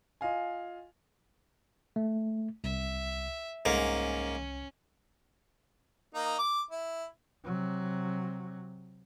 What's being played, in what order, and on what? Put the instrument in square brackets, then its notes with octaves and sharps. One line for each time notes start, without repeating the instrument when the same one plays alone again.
[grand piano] F4 D#5 F5 G#5
[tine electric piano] A3
[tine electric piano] C2 [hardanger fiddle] E5
[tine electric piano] C2 [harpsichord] G#2 A#3 [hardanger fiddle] C#4
[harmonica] A#3 D#4
D6
E4
[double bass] C3 F#3